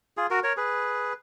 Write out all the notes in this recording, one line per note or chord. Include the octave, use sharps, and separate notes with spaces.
F4 G#4
F#4 A#4
A#4 C#5
G#4 B4